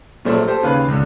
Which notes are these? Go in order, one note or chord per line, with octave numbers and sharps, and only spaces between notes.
A#1 A#2 F#3 A3 C5 D5
G4 A4 C5
D#2 C#3 B4 F5 F#6
C#2 D3